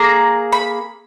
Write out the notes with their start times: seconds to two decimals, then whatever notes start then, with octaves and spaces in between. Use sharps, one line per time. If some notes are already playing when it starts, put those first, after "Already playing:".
Already playing: A#3 G#4 A#5
0.52 B5